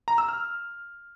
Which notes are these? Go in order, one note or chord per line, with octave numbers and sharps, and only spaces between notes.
A#5
E6
F6